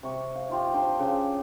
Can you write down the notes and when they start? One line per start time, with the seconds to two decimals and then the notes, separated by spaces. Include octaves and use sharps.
0.03 C3 C#6
0.35 F5
0.49 D#4 F4 G4
0.74 D4 G4 C5
0.99 C#3